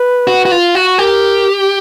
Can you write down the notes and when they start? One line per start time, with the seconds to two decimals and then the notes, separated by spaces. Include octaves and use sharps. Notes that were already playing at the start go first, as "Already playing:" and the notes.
Already playing: B4
0.28 F#4
0.46 F#4
0.52 F4
0.75 F#4
0.98 G4 A#4